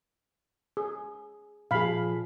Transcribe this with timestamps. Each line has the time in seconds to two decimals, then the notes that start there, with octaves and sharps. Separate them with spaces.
0.77 G#4
1.71 A#2 F3 G#4 F5 B5